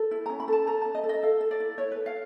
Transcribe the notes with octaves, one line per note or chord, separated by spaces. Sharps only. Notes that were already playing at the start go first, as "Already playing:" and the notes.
Already playing: A4
E4
C#4 A#5
B5
A4 A5
A4 A#5
C#4 A5
D#5
A4
D#5
A4 F5
A4
D5
E4
E4 C#5
A4 B4
F5